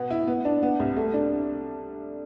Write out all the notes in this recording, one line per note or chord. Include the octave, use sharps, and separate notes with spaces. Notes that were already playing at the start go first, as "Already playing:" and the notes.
Already playing: B2 B3
E4
B3
D4
B3
C2
A3
D4